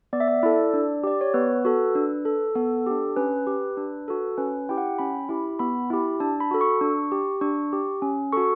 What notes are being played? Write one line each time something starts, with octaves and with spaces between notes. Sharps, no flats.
B3 D5
E5
D5
E4 A4
D4
G4 D5
C#5
B3 B4
F#4 A4
D4
A4
B3 A4
D4 G4
C#4 B4
G4
D4
F#4 A4
C#4 B4
E4 G4 G5
F#5
G5
C#4 B5
E4 G4
B3 B5
E4 G4
D4 A5
B5
F#4 A4
C#6
D4
G4
D4 C#6
G4
C#4
F#4 A4 C#6